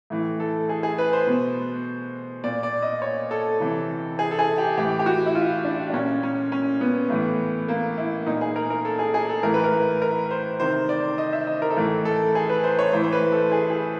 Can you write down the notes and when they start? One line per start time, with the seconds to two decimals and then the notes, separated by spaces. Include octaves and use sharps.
0.10 A2 E3
0.40 A4
0.69 G#4
0.83 G#4
0.98 B4
1.13 C5
1.27 B2
2.44 A#2 D5
2.63 D5
2.82 D#5
3.02 C#5
3.31 A4
3.60 C3 E3
4.19 G#4
4.31 A4
4.39 G#4
4.58 G4
4.77 A2 E3 G4
4.99 G4
5.06 F#4
5.26 E4
5.35 F4
5.64 D4
5.90 D4
5.93 A#2 C#4
6.23 C#4
6.52 C#4
6.81 B3
7.10 A2 E3
7.68 A#3
7.98 E4
8.26 A#2 D#4
8.41 G#4
8.56 A#4
8.70 A#4
8.85 A4
8.99 G#4
9.14 G#4
9.29 A4
9.43 A2 E3 A#4
9.54 B4
9.64 A#4
10.02 A#4
10.31 C5
10.60 C3 D#3 C5
10.89 D5
11.18 D#5
11.33 E5
11.47 D#5
11.62 A#4
11.71 A4
11.76 A2 E3 A#4
12.05 A4
12.35 G#4
12.49 B4
12.64 C5
12.79 C#5
12.93 A2 E3 C5
13.04 C5
13.12 B4
13.32 A4
13.52 G#4
13.70 G#4